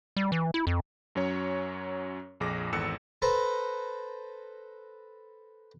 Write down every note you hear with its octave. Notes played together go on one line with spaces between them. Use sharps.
G3
E3
E4
F2
F#2 F#3 C#4 C#5
A#1 F2 G#4 D6 A#6
G#1 E2 A4 E6 F#6 C#7
A4 B4 C5 A#5